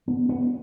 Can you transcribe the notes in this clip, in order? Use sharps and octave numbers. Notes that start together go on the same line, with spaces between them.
B3
B3